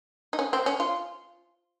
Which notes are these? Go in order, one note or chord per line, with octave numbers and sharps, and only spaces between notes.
D#4
C#4
C4
C#4
F4